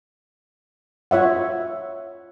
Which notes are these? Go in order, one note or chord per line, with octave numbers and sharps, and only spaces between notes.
F4 C#5 E5 F#5